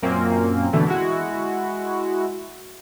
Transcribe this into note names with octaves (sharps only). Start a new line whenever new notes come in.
F#2 A#2 A#3 C4 C#4
B2 D3 E3 A3
G#3 E4 F#4